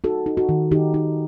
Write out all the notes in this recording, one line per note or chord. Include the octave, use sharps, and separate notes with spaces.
D#4 F#4 A4
D#4
F#4
D#3
D#3 D#4 G4
D#4